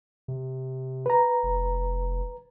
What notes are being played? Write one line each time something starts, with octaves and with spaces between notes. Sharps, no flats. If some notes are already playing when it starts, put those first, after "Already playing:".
C3
B4 A#5
F1